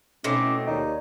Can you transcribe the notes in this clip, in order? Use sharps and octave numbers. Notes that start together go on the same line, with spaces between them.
B2 A3 C4 C#4 D#4 E4 D6
D#2 D#4 G4 C#5 D5